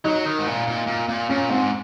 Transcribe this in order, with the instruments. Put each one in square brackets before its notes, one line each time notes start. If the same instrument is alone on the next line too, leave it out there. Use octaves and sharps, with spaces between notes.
[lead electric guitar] F#3 [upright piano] D#4
[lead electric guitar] D#3
G#2
A#2
A#2
A#2
A#2
[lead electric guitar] A#2 [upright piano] C#4
[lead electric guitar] G#2 [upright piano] C4